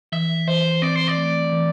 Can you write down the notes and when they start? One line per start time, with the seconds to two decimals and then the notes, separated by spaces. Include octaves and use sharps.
0.12 E3 E5
0.48 E3 C5
0.82 C4 D5
0.96 C5
1.08 D5
1.18 A3
1.52 E3